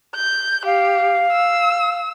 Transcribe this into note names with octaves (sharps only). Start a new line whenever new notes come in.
G6
G4 F5
E6